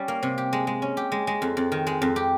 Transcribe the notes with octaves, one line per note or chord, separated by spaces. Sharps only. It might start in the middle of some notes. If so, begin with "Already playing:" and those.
Already playing: G3 C#4
A#3
C3
G4
G#3
G#3
C#4
G4
G#3
G#3
F2
F2
D#3
G#3
F2
G4